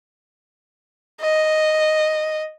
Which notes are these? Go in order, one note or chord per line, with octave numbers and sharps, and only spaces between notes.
D#5